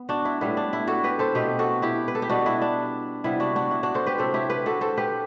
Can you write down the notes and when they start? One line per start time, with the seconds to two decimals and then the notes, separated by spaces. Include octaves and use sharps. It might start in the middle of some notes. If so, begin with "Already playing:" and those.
Already playing: B3
0.09 D4 F#4
0.25 E4
0.41 A2 G3 B3 E4
0.57 D4
0.73 E4
0.87 F#4 A4
1.04 G4 B4
1.19 A4 C5
1.35 B2 A3 C4 G4 B4
1.59 F#4 A4
1.82 E4 G4
2.08 B4
2.15 A4
2.22 G4
2.29 B2 G3 B3 D4 F#4
2.46 E4
2.62 D4
3.24 C3 G3 B3 E4
3.40 D4 F#4
3.56 D4 F#4
3.71 E4
3.83 D4 F#4
3.94 A4 C5
4.06 G4 B4
4.18 C3 F#3 C4 F#4 A4
4.34 E4 G4
4.50 G4 B4
4.66 F#4 A4
4.81 A4 C5
4.97 G4 B4